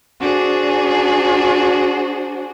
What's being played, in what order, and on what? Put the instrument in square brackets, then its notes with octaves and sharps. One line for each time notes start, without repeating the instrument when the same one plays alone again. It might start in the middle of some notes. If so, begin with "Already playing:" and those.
[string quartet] D4 F#4 G#4 C5